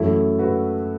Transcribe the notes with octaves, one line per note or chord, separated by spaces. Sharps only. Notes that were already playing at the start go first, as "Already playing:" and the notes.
Already playing: F#2 E3 A3 E4 A4
F#4 B4